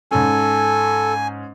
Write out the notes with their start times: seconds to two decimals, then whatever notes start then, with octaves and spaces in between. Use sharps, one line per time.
0.11 G#2 C#4 A4 G#5